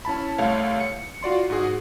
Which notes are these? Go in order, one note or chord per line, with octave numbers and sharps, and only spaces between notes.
C#4 E4 A5 B5
C2 A3 C#5 F5
C#7
F4 F#4 D5 C6
G#2 F#4 G#4